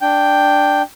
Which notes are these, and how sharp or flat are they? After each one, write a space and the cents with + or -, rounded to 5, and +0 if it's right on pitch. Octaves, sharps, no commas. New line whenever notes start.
D4 +0 G5 +0